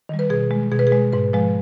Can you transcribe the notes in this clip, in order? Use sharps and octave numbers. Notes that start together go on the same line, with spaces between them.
D#3 G3
B4
B2 G#4
G#3
B2 G#4
B4
G#4
G#3
G#2 B4
F3 G#3 B4